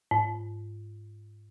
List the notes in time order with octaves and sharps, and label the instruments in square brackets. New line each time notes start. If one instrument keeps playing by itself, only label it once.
[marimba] G#2